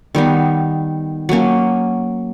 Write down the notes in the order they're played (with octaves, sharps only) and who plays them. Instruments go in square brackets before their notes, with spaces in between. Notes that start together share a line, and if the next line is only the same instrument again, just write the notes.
[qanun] D#3 G3 B3 D#4
F#3 A#3 C#4